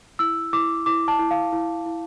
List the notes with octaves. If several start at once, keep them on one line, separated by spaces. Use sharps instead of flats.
E4 E6
E4 D6
E4 D6
A5
E4
F5
E4
E4